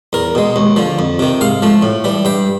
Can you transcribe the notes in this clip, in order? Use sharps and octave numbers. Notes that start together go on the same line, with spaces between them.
E2 A#4
B2 G#3
D#2
D3 F3
F2
C3 D#3
G#2 F5
F3 A3
A2
E3 G3
G2 G5